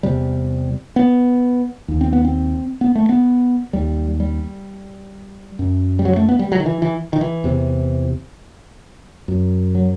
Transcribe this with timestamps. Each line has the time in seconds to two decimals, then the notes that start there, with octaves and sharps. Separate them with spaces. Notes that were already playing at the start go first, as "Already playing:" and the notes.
0.03 E2 C3 G3
0.96 B3
1.88 D#2
2.01 C4
2.13 B3
2.25 C4
2.81 B3
2.95 A3
3.09 B3
3.73 D#2 G3
4.20 G3
5.59 F#2
5.99 G3
6.05 F#3
6.16 A3
6.29 B3
6.39 G3
6.52 F#3
6.60 D#3
6.66 E3
6.82 E3
7.13 D#3
7.21 E3
7.44 E2 C3
9.28 F#2
9.75 F#3